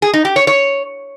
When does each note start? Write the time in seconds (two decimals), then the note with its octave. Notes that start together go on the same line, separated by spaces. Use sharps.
0.02 G#4
0.14 D#4
0.25 G4
0.36 C#5
0.47 C#5